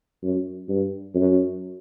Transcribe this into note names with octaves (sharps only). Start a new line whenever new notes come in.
F#2
G2
F#2